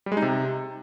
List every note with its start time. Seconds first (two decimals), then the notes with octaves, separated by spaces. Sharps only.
0.06 G3
0.12 G#3
0.17 D#4
0.22 C3